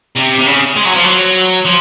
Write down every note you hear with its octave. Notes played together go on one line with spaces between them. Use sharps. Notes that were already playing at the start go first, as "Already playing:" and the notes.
C3
C3
C#3
G#3
F#3
F3
F#3
F3